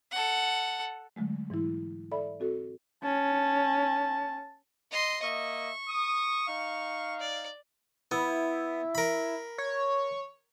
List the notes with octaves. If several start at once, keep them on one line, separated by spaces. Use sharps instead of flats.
A4 F#5
D3 F#3 G#3 A3
G#2 E3 F#3 E4
A4 D5 E5 B5
C4 F#4 A4
C#4 A5
D#5 C6
A#3 D#5 E5 C#6
D#6
D#4 F5
D5
B3 E4
A#4 B5
C#5